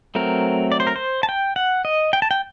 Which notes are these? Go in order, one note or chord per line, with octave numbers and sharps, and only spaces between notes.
F#3 A3 C4 A#4
D5
C5
A#4
C5
A5
G5
F#5
D#5
G5
A5
G5